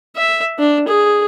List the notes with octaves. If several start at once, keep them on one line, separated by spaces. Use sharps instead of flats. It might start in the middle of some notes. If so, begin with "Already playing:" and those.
E5
D4
G#4